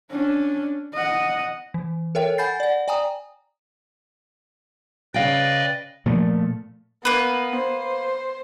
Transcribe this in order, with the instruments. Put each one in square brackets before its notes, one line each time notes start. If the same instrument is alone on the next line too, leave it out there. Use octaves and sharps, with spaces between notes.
[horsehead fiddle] C#4 D4
D#5 F#5
[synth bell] E3
A4 A#4 C#5 E5 G5
F#5 G#5 B5 G6 A6 C7
D5 F#5
D5 G5 G#5 A#5 D#6
[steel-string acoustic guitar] C#3 F5 G5 [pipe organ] B4 D5 D#5
[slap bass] A#2 F3 A3
[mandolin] A#3 B4 [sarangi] B3
[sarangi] C5